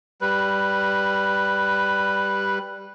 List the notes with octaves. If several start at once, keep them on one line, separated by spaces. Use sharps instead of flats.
G3 B4